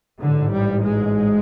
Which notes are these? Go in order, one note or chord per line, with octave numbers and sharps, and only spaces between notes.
A1 G#2 D3
G3
G#3